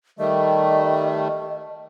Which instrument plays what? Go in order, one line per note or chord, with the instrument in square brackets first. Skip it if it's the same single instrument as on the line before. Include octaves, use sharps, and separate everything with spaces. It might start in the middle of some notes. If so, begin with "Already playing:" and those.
[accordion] D#3 G3 A3 [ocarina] D#5